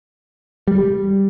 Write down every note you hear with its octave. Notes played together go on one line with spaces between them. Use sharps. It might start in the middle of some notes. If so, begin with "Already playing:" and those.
G3